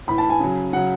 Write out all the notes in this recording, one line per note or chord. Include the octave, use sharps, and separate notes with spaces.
A2 E3 B5
A5
G#5
C#3 F#3
C#3 F#3 F#5